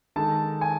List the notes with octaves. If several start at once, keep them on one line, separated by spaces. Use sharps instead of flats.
D#3 G#3 D#4 A4 A5
G#5